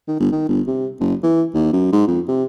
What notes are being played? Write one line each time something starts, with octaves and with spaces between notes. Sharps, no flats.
D#3
G1
D#3
G1
C3
F#1
E3
D#2
F#2
G#2
F2
C3